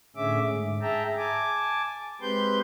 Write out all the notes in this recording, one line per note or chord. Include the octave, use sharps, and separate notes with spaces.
A2 D3 C#4 G#4 E5 D6
G#2
G#4 E5 G5 A5 A#5
G#5 A5 D6
G#3 C4 G4 B4 C6 G6